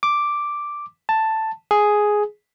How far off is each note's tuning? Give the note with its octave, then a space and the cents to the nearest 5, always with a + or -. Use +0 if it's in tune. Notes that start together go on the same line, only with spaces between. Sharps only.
D6 +0
A5 +5
G#4 +5